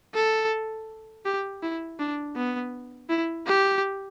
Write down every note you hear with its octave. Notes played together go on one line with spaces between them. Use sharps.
A4
G4
E4
D4
B3
E4
G4